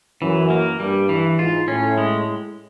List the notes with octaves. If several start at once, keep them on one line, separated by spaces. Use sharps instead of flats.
F#2 E3
A#3
G2 G3
E3
G#2 F4
A2 C#4
G#3